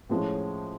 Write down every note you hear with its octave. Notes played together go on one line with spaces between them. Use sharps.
A2 F3 G#3 C#4